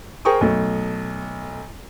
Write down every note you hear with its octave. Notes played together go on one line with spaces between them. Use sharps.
G#4 A#4 C5 G5 C#6 D#6
B1 A3